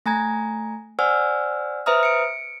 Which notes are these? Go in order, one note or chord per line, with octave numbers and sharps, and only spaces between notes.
A3 G#5 A#5 G#6
C5 D5 F#5 G#5 E6 F6
B4 C5 E5 A#5 D#6 F6
C#7 D7